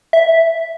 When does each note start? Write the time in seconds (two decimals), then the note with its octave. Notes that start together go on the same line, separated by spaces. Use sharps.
0.13 E5